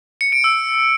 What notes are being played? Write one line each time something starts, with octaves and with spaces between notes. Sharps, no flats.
C#7
D7
E6